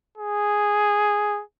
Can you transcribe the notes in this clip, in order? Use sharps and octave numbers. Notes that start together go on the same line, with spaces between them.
G#4